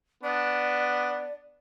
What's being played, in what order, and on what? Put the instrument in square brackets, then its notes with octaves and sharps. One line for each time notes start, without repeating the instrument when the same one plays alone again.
[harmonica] B3 D4 [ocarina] D5